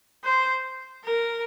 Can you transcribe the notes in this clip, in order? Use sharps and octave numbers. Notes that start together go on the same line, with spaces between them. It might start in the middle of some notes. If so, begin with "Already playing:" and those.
C5
A#4